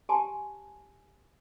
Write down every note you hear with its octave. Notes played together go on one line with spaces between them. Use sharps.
G4 G#5 A5 C6